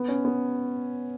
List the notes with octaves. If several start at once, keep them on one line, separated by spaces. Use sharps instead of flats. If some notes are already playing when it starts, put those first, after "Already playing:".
Already playing: B3
C#4
B3